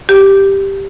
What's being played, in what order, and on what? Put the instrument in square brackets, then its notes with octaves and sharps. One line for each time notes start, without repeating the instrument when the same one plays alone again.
[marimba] G4